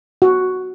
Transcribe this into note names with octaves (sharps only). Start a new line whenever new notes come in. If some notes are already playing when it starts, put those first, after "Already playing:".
F#4